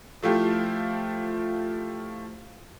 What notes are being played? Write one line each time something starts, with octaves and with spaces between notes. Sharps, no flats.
F3 A3 E4 F4 G4